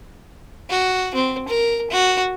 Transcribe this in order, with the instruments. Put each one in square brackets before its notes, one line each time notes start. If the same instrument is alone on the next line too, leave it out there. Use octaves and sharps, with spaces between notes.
[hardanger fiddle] F#4
C4
A#4
F#4